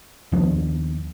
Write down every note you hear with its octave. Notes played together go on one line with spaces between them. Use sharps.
D#2 F3 B3 D4